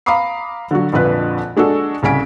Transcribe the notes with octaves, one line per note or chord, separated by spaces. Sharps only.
F5 A#5 B5 D6 D#6 C7
D3 F#3 F#4
A#1 F2 D3 F4 B4 F#6
G#3 D4 F#4 A4
C2 C#3 G#5 B6 D7